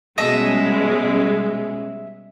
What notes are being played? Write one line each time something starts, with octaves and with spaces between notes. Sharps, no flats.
B2 G3 G#3 C#4 D#5 E5 A5